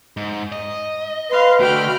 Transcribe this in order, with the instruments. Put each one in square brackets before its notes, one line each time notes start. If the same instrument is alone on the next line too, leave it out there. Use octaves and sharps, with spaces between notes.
[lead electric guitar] G#2
D#5
[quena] B4 [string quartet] F5 C6
[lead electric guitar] D3 A3 [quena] F#4 [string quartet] G5 B5 F6